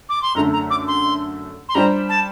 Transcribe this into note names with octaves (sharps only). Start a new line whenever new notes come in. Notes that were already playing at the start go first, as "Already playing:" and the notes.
D6
C6
F#2 D3 A3 A#5
A#5
D6
C6
C6
G3 D4 G4 C5 A#5
A5